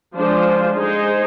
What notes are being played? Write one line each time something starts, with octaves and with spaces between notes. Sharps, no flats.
F3 G#3 D4 F4 C5
G#3 D#4 G#4 C5